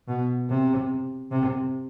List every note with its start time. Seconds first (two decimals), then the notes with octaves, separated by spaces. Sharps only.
0.08 B2
0.49 C3
1.32 C3